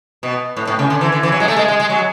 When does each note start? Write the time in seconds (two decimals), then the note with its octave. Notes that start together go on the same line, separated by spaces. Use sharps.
0.23 B2
0.57 A2
0.67 A2
0.79 C#3
0.90 D3
1.01 E3
1.12 D3
1.23 E3
1.32 F#3
1.40 G#3
1.48 A3
1.56 G#3
1.68 G#3
1.80 G#3
1.90 F#3